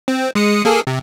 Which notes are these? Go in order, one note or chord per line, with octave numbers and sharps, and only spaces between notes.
C4
G#3 D#6 C#7
A#3 G#4 A4
C3